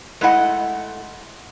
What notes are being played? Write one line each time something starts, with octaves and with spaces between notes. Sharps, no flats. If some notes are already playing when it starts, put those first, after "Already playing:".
G#3 A3 E4 D#5 F#5